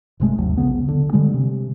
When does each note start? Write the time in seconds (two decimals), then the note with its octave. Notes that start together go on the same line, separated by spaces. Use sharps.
0.20 G1 C3 G#3 A3
0.38 G#1 D#2 F#3
0.57 A#1 C#3 B3
0.88 D3
1.13 D3 G3 G#3
1.34 C3